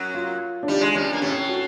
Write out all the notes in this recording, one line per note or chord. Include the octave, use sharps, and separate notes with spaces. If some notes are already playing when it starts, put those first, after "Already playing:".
Already playing: F#2 F#3
F4
D4
G3 D#4
G#3
G2 G3 C#4
A#3
A2 A3 C#4
F#4